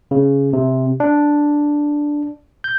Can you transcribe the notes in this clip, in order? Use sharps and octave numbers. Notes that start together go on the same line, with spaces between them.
C#3
C3
D4
G6